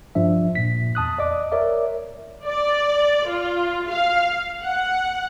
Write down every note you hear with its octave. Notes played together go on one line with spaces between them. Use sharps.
G2 F3 D4 E5
A#2 B6
E2 A5 D#6 F#6
D5 D#5 D6
A#4 C#5 D5 E5 D6
D5
F4
F5
F#5